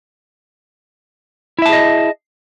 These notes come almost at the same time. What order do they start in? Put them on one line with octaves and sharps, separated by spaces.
E4 E5 A5 G#4 D#5